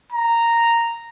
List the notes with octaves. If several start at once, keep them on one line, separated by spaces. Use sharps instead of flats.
A#5